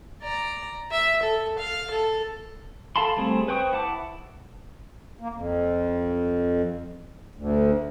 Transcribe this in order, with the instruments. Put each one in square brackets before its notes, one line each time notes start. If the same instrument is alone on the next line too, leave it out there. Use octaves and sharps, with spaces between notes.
[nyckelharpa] D5 A#5
E5
A4
F5
A4
[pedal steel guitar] A4 F5 A5 B5 C6
G3 A3 C4 G#4
B4 C5 G5 C#6 D#6
E4 F#5 A5 D6
[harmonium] A#3
F2
D2